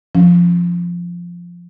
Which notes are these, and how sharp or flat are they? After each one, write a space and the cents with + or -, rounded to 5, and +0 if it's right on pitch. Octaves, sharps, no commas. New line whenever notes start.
F3 +0 C#4 +0